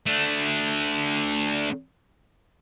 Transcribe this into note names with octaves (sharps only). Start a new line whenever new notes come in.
A3 D4